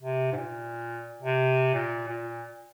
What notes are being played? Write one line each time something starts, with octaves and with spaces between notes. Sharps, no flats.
C3
G#2
A#2
C3
A#2
A#2